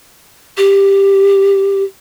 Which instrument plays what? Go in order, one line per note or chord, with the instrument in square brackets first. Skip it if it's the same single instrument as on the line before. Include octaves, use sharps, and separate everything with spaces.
[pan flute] G4